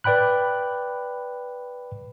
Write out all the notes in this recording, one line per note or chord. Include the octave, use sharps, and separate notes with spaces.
B4 D5 G5 B5 F#6